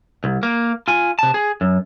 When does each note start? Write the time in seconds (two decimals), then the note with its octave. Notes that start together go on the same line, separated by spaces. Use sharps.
0.24 C2
0.43 A#3
0.88 F4 G#5
1.19 C3 A5
1.34 G#4
1.61 F#2